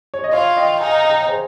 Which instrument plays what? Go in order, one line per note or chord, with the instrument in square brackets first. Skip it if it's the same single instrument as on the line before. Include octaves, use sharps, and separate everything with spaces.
[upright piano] C#5
D#5
[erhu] F4 [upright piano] C#5 F5
[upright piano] D#5 G5
[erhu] D#4 [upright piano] F5 G#5
[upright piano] G5 A#5
C#5
G#4 C5